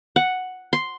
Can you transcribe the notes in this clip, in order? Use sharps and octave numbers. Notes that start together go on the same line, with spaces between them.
F#5
C6